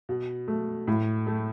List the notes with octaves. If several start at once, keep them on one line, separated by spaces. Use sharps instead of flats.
B2
A3
A2
A3